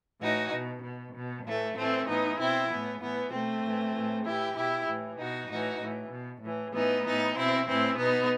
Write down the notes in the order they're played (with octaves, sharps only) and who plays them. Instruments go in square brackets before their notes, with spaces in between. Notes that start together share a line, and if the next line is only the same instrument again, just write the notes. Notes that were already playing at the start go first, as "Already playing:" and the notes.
[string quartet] A2 E3 D#4 F#4
B2
B2
B2
A2 E3 A3
A2 E3 A3 C4
A2 E3 B3 D#4
B2 C4 E4
A2 E3 B3
A2 E3 B3
B2 A3 C4
A2 E3
A2 E3
A2 E3 E4 G4
B2 E4 G4
A2 E3
B2 D#4 F#4
A2 E3 D#4 F#4
A2 E3
B2
A2 E3
A2 E3 B3 D#4
A2 E3 B3 D#4
B2 C4 E4
A2 E3 C4 E4
B2 B3 D#4